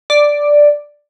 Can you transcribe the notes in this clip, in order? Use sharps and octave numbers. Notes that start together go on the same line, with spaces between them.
D5